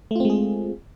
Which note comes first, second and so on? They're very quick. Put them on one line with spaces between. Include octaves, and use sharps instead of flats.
A3 F4 C4 G#3 G#4